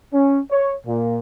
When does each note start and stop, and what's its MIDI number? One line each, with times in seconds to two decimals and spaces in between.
0.13 0.39 61
0.51 0.73 73
0.86 1.17 46